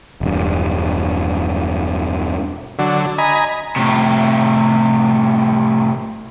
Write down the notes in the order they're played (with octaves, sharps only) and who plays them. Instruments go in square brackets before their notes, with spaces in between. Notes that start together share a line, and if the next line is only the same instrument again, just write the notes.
[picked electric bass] E1 G2
[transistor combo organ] D3 F#3
D#5 G#5 A#5 B5
[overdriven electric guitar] A2 C3